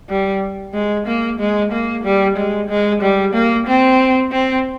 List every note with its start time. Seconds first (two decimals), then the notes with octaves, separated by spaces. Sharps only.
0.09 G3
0.74 G#3
1.07 A#3
1.39 G#3
1.72 A#3
2.04 G3
2.37 G#3
2.69 G#3
3.02 G3
3.34 A#3
3.67 C4
4.32 C4